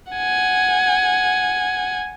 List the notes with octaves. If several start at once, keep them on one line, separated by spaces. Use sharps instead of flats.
F#5 G#5